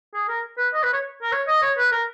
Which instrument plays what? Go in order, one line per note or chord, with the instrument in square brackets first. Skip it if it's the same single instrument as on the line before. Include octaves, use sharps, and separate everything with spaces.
[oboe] G#4
A#4
B4
D#5
B4
C#5
A#4
C#5
D#5
C#5
B4
A#4